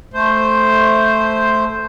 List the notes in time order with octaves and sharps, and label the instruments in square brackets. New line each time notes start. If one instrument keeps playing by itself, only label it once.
[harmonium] A3 C5